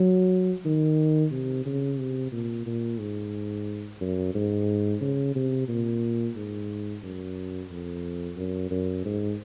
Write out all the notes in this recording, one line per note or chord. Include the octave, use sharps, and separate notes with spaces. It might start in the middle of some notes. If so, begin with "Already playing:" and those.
Already playing: F#3
D#3
C3
C#3
C3
A#2
A#2
G#2
F#2
G#2
C#3
C3
A#2
G#2
F#2
F2
F#2
F#2
G#2